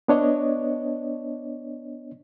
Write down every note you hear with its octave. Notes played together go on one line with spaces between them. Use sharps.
B3 D4 C#5 D#5